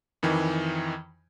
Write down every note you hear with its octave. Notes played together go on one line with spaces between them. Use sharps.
F2 D#3 E3